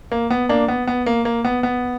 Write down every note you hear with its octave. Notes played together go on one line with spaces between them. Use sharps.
A#3
B3
A#3 D4
B3
B3
A#3
A#3
B3
B3